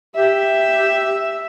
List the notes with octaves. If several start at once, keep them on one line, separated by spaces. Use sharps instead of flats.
G4 E5